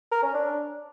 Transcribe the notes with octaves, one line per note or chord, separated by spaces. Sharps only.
A#4
C#4
D4